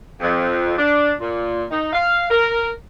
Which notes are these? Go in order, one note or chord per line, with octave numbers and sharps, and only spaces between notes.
F2
D4
A#2
D#4
F5
A#4